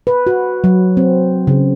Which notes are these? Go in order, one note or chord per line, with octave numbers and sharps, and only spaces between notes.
B4
F#4
F#3
C4
C#3